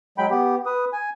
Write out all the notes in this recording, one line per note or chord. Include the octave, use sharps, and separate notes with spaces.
F#3 G#3 G5 B5
B3 G4
B4 D#6
G#5